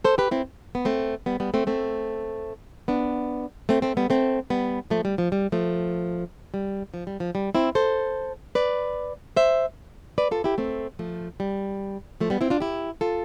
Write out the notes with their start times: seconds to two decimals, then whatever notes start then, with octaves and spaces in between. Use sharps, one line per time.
0.05 A4 C5
0.18 G4 B4
0.31 C4 E4
0.75 B3
0.85 A3 C4
1.26 G3 B3
1.40 G3 B3
1.54 A3 C4
1.67 A3 C4
2.88 B3 D4
3.69 A3 C4
3.82 A3 C4
3.97 G3 B3
4.10 A3 C4
4.50 G3 B3
4.90 F3 A3
5.05 G3
5.18 F3
5.32 G3
5.52 F3 A3
6.54 G3
6.94 F3
7.07 G3
7.20 F3
7.35 G3
7.55 C4 E4
7.75 A4 C5
8.55 B4 D5
9.36 C5 E5
10.18 B4 D5
10.31 F4 A4
10.44 E4 G4
10.58 A3 C4
10.99 F3 A3
11.40 G3
12.20 F3 A3
12.30 G3 B3
12.41 C4 E4
12.50 D4 F4
12.60 E4 G4
13.01 F4 A4